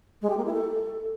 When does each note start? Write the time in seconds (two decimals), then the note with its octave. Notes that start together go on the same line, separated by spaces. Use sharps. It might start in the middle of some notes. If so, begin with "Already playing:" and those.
0.22 G#3
0.30 G4
0.37 A#3
0.45 E4
0.53 A4